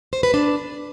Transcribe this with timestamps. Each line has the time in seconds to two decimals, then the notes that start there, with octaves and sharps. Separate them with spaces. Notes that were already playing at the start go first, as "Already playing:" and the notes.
0.13 C5
0.23 B4
0.34 D4